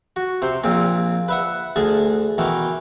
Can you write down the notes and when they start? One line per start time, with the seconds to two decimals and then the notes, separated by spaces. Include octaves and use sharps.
0.16 F#4
0.42 C3 C5
0.64 A#1 A#2 C4
1.28 B4 E5 F#5
1.76 D2 G#4 G#5 A5
2.38 B2 D#3 E3